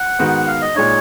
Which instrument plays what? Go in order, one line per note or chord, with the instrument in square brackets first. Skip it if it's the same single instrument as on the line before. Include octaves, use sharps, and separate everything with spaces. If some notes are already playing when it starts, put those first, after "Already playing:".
Already playing: [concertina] F#5
[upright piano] G#2 D#3 G#3 B3 F#4
[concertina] F5
D#5
[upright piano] A#2 G#3 D#4 [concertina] C#5